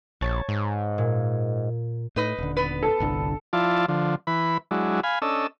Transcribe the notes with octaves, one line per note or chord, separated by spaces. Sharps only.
A#1 C#5 A5 A6
G#2
A#2
A2 D#4 B4 D#5
D#1 D3
B3 B4
A4
G1 C2 D3
F3 E4 F4 D5 A5
D3 F3
E3 B4 B5
F#3 G#3 D4 E4
F5 G#5 B5
C#4 D4 A4 D#5 E6